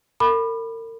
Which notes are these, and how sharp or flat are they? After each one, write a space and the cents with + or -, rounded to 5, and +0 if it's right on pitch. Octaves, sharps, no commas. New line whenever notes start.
A#4 -40 B5 +0 D6 +40